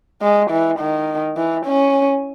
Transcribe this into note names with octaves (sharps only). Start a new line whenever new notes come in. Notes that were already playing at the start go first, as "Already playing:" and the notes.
G#3
E3
D#3
E3
C#4